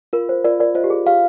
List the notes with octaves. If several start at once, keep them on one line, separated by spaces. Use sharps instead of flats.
F4 A#4
C5
F4 A#4 D5
A#4 D5
F4 C5 D#5
G4
G#4
G4 F5